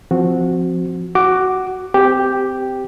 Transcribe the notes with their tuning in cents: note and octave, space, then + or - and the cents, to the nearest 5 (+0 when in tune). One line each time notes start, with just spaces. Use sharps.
F3 +0 C4 +0 F#4 -10
F#4 +10 D6 +0
C4 -20 G4 +0